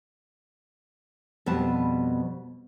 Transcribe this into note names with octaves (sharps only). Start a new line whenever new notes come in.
F2 B2 G3 B3 B4 A5